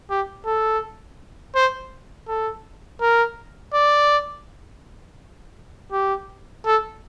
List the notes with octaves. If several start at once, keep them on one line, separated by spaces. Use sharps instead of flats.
G4
A4
C5
A4
A#4
D5
G4
A4